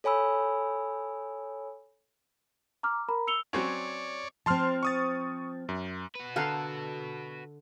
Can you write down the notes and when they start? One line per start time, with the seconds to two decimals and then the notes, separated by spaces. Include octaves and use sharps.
0.04 A4 C#5 G#5 B5 E6
2.83 A#5 D6 F6
3.08 A#4 A#5 B5
3.27 E6 C#7 F7 G7
3.53 F#3 C4 C#4 C#5 D5
4.46 F3 C4 A5 C6 F6
4.83 C#6 D#6 A6
5.69 F#2
6.15 F#4 B4
6.36 D3 A4 F5 F#5 A#5